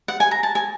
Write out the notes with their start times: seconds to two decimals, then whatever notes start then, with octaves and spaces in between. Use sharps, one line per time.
0.08 F#5
0.20 G#5
0.31 A#5
0.43 A5
0.55 G#5